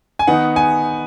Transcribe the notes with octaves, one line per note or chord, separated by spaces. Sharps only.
G#5
D#3 B3 D#4 F#5
G#5